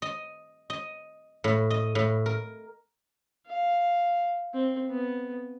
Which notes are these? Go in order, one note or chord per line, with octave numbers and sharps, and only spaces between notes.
D#5
D#5
A2
D#5
A2
A#4
F5
C4
B3